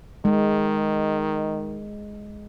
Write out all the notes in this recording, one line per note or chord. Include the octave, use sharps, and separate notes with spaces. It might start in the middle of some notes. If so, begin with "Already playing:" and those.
D#3 G#3